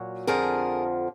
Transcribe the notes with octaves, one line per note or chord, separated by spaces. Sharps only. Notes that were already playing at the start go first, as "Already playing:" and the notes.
Already playing: A#2 F#3
F2 D3 F3 G#4 A#4